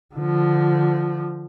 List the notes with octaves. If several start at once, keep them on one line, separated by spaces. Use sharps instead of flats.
D3 F3